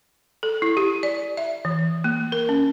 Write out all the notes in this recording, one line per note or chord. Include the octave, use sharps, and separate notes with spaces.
A4
E4
G4
D5
E5
E3
A#3
A#4
C#4